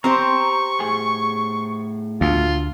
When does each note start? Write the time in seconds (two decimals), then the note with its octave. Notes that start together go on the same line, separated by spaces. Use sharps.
0.04 C4 G4 C5 A#5 C#6
0.80 A2 G#4 G#5
2.21 D2 F4